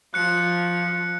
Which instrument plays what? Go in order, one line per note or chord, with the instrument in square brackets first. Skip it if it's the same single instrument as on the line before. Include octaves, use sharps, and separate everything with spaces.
[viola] F3 [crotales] F#6 C#7